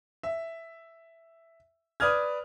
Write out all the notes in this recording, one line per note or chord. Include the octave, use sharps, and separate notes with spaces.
E5
B4 D5 D#6 F6 G#6